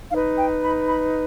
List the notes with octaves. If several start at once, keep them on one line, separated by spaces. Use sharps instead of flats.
D#4 B4 F5
G5
B5
B5